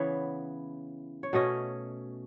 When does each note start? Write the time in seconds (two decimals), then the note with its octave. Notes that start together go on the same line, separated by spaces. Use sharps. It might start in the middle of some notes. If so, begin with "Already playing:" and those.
Already playing: C#3 E3 B3 C#5
1.23 C#5
1.33 B2 A3 C#4 D#5